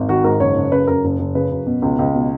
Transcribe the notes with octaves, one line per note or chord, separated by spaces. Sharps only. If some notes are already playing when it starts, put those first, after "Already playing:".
Already playing: G#1
D#3 F#4
G#2 A#4
F#1 C#5
F#1
C#3 B4
F#2 A#4
F#1
F#1
C#3 B4
F#2
B2
C#2
C#2
B2